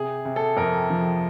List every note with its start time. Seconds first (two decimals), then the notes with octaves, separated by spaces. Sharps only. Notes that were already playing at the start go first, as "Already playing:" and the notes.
Already playing: C3 G#4
0.25 C3
0.36 A4
0.57 F2 A#4
0.90 F3